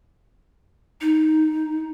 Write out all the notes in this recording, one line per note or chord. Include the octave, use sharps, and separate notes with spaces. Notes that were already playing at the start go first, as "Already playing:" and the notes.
D#4